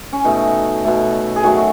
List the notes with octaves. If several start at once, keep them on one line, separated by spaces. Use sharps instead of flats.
C#4
B2 A3 D#4
B2 A3
G#4
D#3 F#3 A3 F#4